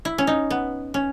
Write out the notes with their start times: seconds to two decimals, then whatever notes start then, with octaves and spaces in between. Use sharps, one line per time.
0.05 E4
0.18 C#4
0.27 D#4
0.50 B3
0.94 C#4